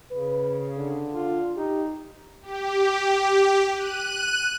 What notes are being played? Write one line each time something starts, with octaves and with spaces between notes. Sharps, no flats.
C#3 B4
D3
F4
D#4 G4
G4
F#6 D#7